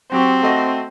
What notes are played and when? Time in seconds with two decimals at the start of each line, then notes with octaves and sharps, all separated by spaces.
0.12 F#3 C4 G4 C#6
0.42 A3 F#4 D#5